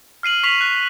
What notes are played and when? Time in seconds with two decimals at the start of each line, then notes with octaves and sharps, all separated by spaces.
0.23 F6 C7 D#7 F#7
0.43 C#6 B6 C7 D#7 F7 F#7
0.61 F#6 B6